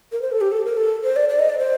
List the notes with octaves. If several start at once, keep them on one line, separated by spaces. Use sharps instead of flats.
A#4
C5
A4
G4
A4
A#4
A4
C5
D5
D5
D#5
D5
C5